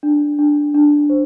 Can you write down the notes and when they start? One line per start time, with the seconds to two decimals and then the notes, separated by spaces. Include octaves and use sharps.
0.03 D4
0.39 D4
0.74 D4
1.10 C5